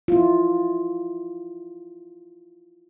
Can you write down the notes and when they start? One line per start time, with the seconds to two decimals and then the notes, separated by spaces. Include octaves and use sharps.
0.08 E4 F4